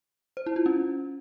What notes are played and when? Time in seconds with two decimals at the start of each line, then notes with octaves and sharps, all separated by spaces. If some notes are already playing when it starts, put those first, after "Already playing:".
0.37 C5
0.46 E4
0.56 F4
0.66 C#4